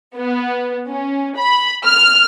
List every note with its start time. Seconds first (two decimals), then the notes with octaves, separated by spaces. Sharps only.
0.16 B3
0.88 C#4
1.36 B5
1.86 F6